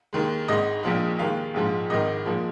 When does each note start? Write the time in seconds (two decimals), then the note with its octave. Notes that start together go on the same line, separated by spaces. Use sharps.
0.13 D#2 D#3 G#3
0.48 G#1 G#2 G#3 D#5
0.83 A#1 A#2 F3 G#3
1.19 D#2 D#3 G#3 F5
1.54 A#1 G#2 F3 G#3
1.90 G#1 G#2 D#3 D#5
2.26 A#2 F3 G#3